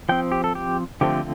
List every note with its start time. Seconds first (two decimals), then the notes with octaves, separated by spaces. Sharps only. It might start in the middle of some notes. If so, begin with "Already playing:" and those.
0.09 F3 C4 G5
0.32 G4
0.44 A4
0.55 G4
1.01 D3 F3 A3 C4 G4